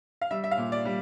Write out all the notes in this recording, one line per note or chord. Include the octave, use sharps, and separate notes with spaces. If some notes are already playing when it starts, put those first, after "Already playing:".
F5
G3 E5
E5
F5
A#2
D5
G3